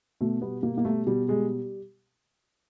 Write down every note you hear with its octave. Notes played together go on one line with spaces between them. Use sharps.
B2 A3
G3 B3
B2 A#3
A#3
G3 A3
B2 G3
G3 G#3